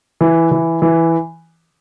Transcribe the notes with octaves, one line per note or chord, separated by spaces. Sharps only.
E3
E3
E3